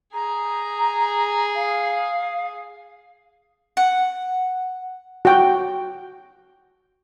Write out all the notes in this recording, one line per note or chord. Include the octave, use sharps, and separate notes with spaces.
G#4 A#5
F5
F#5
F#4 G5